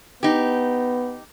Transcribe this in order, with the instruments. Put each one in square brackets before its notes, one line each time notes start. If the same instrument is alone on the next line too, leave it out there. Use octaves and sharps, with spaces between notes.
[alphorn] B3 [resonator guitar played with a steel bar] D#4 G4